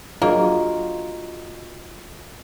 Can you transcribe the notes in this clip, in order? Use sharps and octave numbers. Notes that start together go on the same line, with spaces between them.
F#3 A#3 D4 F4 F#4 G#4 D#5